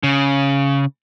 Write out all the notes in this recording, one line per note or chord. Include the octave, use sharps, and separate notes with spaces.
C#3